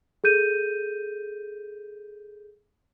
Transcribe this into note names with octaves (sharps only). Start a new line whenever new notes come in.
G#4 A4 G6 D#7